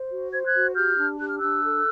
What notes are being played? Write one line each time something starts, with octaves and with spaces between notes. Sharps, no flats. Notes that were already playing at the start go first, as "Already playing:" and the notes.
Already playing: C5
F#4
C5 G#6
F#6 G#6
F#4
G4 F6 G6
D4
G4 F#6
F6
D4 E6 F#6
A4